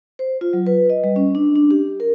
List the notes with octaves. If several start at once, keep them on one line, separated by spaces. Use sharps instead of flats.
C5
F4
F#3
B4
D#5
G3
C#4
D4
D4
G4
A#4